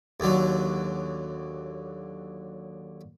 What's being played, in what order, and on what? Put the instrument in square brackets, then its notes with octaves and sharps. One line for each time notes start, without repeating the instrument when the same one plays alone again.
[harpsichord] D#2 D3 F#3